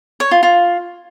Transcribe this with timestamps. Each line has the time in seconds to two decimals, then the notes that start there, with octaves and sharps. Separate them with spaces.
0.20 C#5
0.31 F4
0.43 F4